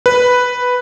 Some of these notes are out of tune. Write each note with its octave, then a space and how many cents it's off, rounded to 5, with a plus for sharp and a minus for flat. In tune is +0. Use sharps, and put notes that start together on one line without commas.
B4 +0